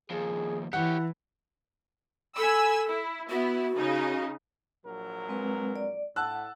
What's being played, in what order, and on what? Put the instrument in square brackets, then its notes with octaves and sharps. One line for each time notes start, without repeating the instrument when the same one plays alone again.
[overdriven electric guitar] D#2 F3 [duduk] G#4
[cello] E3 [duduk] E4 [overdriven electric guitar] G4 C#5 [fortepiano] F#5
[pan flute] A4 [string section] G#5 B5 E6
[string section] E4
[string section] B3 E4 [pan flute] F#4
[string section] C#3 D#4
[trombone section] A#1 F#3 A#4
[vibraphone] G#3 C4 B4
D5
[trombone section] A2 [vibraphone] F#5 [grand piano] A5 E6 F#6